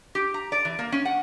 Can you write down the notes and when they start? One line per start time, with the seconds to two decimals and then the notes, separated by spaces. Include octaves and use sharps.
0.15 G4
0.34 A#5
0.52 D5
0.65 E3
0.79 A#3
0.92 C#4
1.05 F#5